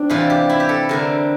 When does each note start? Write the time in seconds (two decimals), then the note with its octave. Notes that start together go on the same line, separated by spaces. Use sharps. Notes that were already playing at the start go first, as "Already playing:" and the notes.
Already playing: C4 D4
0.10 C3 E3 G3 F4
0.30 G4
0.49 E4
0.60 G4
0.69 A4
0.89 D3 G3 C4 A#4